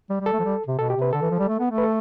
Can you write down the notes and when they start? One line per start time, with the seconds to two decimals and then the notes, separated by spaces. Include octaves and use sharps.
0.10 G3
0.20 G3
0.26 A4
0.33 A3
0.39 F3
0.44 G3
0.68 C3
0.79 B2 A4
0.90 G4
0.96 C3
1.02 B4
1.13 D3 A4
1.22 E3
1.31 F3
1.39 G3
1.49 A3
1.60 B3
1.71 A3
1.78 B4
1.83 A4